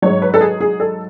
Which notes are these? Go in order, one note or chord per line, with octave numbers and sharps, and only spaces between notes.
G#2 F#3 C#5
B4
A4
G#4
G#4
A4